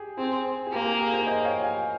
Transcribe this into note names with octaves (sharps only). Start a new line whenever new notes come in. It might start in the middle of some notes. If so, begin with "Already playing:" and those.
Already playing: G4 G#4
C4 G#4
G#4
A#3 G4
G#4
G4 A#4
G#4 C5
C5 D#5
G5
C#5 F5
F5 G#5